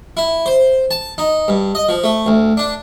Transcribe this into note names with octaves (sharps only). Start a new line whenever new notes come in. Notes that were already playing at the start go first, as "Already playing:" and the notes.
E4
C5
A5
D#4
G2
D#5
F3
A3
D2
D4